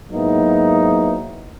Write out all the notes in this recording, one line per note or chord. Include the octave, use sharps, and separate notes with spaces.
G#2 F#3 A#3 B3 D#4 E4